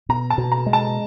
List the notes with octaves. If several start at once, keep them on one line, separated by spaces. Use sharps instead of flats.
B2 A#5
A5
B2
A#5
G#3
A5